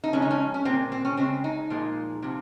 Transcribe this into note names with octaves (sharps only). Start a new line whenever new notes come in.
D#4
C#3 F3 G#3 C#4
D#4
C#4
C#4
A#2 G#3 C4
C4
C#4
C#3 G#3 C4
D#4
A#2 F3 G#3
C3 F3